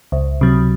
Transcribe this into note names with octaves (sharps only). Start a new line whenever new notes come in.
C#2
C3 F#3